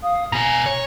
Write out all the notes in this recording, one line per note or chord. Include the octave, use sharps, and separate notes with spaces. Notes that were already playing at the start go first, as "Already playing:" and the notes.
F5 D#6
B2 F5 G#5 A#5
C#5